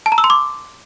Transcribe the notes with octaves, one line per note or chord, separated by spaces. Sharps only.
A5
A#5
E6
C6
D6